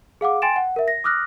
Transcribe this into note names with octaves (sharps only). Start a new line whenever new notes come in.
G#4 F5 F#5 D6
G5 G#5 C6 A6 D7 E7
F#5
A#4 E5
A#6
D6 D#6 F6 F#6 A#6